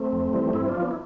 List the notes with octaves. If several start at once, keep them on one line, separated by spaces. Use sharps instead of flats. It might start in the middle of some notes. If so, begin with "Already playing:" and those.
Already playing: A3 C4
F2
E3 G3
G2 C4 E4
D4 F4
F3
B3 D4
E4